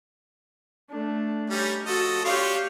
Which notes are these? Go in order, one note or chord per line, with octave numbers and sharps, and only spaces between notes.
A3 D4
G3 C#4 D#4 G4
F3 F#4 A4 D#5
D4 F4 G4 C#5 F5